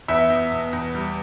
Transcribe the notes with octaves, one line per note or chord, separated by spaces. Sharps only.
E2 E5
E2
B2
E2
G3